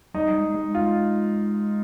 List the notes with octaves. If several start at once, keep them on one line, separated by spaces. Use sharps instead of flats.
G3 D#4
G#3
G#3
F4